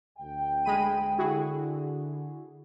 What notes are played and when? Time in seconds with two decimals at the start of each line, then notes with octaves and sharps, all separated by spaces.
0.18 D2 G5
0.65 G#3 B5 D#7
1.18 D3 E4 F#4 G#4